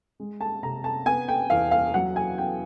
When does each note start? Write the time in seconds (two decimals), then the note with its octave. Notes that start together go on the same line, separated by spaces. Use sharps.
0.20 G#3
0.41 A5
0.62 C3 A#5
0.84 A5
1.06 B3 G#5
1.28 G5
1.50 E2 F5
1.71 F5
1.94 F#3 F#5
2.16 G#5
2.38 B3 G5